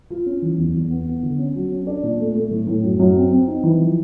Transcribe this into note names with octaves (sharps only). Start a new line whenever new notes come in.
F4
C#4
E3
E2
E2
B3
B3
D3
C#4
F#3
C#4
D4
A#2
A3
A3
A2
A2
F#2
F#2
C4
C4
D#4
E3
F3